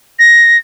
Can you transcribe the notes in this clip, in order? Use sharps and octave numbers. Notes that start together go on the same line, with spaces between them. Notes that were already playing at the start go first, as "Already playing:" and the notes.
A#6